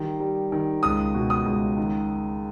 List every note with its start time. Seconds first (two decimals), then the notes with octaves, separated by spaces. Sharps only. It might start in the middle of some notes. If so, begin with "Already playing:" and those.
Already playing: D#3 G3
0.20 G3
0.52 D#3
0.83 C#2 D#6
1.14 B2
1.30 D#6
1.46 C#2
1.77 D#3